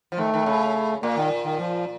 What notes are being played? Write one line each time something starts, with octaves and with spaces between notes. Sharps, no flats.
F3
D#3 A3
D#3
C#3
A#2 A#3
D#3
D#3
F3